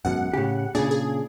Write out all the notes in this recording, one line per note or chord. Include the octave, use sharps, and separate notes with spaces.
G#1 F#2 B2 F#5
A2 C#3 G4
A#2 C#3 D4 G#4
G#4